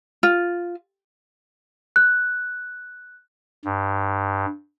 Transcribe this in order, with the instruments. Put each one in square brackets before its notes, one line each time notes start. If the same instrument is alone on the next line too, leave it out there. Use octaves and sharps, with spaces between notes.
[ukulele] F4
[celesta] F#6
[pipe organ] G2